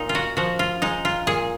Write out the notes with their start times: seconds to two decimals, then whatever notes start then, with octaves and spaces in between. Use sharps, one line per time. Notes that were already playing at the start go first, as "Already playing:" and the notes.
Already playing: A#2 D#4
0.09 F4
0.15 F#4
0.37 F3 F#4
0.59 F4
0.82 G#3 D#4
1.05 F4
1.27 A#2 G#4